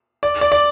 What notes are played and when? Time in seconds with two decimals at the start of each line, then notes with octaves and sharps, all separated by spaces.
0.23 D5
0.41 D5
0.52 D5